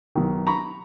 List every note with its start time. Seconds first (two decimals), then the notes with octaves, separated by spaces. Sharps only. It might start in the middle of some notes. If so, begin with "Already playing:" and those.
0.15 B1 D#3
0.47 A#5 B5 C#6